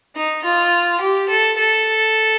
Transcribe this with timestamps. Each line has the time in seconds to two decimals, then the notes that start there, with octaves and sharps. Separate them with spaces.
0.16 D#4
0.44 F4
1.00 G4
1.29 A4
1.57 A4